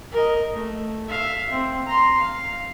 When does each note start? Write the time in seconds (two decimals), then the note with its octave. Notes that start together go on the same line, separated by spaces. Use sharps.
0.12 A#4 D#5
0.53 A3
1.09 E5 F5
1.50 C4
1.86 A#5 C6
2.20 F5